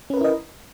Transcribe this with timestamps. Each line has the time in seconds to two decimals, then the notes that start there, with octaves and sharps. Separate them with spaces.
0.10 C#4
0.14 B4
0.17 A#4
0.21 E4
0.24 D#5